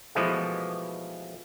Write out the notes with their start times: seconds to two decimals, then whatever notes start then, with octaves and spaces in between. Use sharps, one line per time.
0.15 B2 E3 F3 G#3 A3